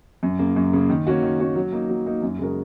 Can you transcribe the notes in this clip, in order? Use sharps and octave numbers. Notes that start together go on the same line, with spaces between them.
F#2
C#3 A#3
F#2
C#3 A#3
D#3
A#3 C#4 F#4
D#3
A#3 C#4 F#4
F#3
A#3 D#4
F#3
A#3 D#4
F#2
C#3 G#3 F#4 A#4